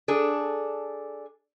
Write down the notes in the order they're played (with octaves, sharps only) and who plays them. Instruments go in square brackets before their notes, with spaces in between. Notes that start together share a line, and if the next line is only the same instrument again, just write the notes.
[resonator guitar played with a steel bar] D4 G#4 A4